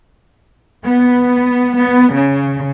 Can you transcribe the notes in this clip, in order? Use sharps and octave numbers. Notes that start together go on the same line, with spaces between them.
B3
B3
C#3